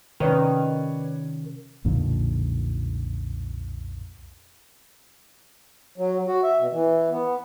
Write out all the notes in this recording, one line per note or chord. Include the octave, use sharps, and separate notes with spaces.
C3 D#3 C#4 B4 C#5 D5
B1 F2 A#2 D3
F#3
F#4
E5
B2
E3
B3